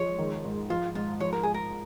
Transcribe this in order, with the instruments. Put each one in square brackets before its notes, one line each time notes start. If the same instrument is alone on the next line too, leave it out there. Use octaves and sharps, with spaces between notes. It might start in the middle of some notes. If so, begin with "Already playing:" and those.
Already playing: [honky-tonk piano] F3 G#3 [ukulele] C#5
[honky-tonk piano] D#3
G#2
[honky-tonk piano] F3 [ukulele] F4
[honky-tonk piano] G#2 [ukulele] F4
[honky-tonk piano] F3 [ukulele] C#5
[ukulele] A#4
[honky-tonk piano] G#2 [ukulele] G#4
[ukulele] A#4